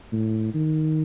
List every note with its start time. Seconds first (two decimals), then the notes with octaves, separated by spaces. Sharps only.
0.12 A2
0.54 D#3